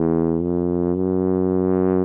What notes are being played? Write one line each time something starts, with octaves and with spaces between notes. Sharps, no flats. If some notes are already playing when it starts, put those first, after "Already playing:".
Already playing: E2
F2
F#2